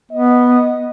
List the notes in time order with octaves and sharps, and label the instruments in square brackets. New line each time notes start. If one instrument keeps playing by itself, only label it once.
[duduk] B3 [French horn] D#5